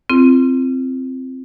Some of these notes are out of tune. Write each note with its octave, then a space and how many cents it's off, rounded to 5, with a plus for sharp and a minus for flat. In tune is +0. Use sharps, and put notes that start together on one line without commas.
C4 +0 F4 -35